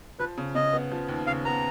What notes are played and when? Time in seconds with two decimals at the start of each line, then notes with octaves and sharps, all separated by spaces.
0.19 F3 B4
0.37 C#3
0.55 C#3 D#5
0.73 B3
0.92 F3
1.08 D#2
1.27 C#3 F5
1.45 B3 A#5